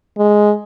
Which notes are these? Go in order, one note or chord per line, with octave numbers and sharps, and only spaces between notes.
G#3